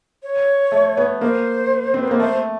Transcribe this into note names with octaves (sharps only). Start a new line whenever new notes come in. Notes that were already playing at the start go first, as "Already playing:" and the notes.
C#5
A3
B3
A#3 C5
C4
B3
A#3
A3 C5